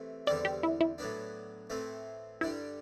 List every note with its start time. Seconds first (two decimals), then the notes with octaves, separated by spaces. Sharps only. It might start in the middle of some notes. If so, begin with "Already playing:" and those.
Already playing: C3 E3 A3
0.27 E2 D3 G3 C4 D5
0.45 G4
0.63 E4
0.81 E4
0.98 A2 F#3 B3 D4
1.70 A2 E3 A3 C4
2.41 G2 D3 G3 E4